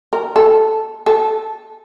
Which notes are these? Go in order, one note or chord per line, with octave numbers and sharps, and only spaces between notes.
A#4
A4
A4